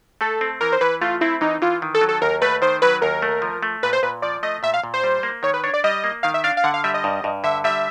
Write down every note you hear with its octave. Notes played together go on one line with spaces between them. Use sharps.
A3 A4
C4
E3 A#4
C5
E3 B4
A3 F4
C4 E4
E3 D#4
E3 F4
D#3
A4
F#3
A4
D#2 A#4
A3 B4
D#3 C5
F#3 B4
D#2 A#4
A3
F3
A3
A#2 B4
C5
A#2 B4
F3 D5
A3 D#5
A#2 E5
F5
A#2
C5
G3
A#3
D#3 C#5
B4
D4 C#5
D5
G3 D#5
A#3
D#3 F5
E5
D4 F5
F5
D3 F#5
F5
G3 E5
D#5
G2
G2
D3 E5
G3 E5